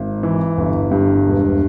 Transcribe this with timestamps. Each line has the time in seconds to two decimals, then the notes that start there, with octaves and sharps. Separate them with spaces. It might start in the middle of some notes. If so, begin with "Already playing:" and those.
Already playing: G#1
0.23 E3
0.58 G1
0.91 G2
1.26 E1